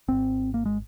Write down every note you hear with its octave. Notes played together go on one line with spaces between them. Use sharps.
G#1 G#2 C4
A#3
G#3